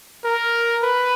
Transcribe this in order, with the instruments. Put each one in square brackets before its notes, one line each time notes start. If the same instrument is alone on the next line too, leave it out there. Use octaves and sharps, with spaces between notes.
[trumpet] A#4
B4